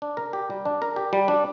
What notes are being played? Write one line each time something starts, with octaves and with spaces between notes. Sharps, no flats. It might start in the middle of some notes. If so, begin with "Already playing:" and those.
D4
A#4
G4
G3
D4
A#4
G4
G3
D4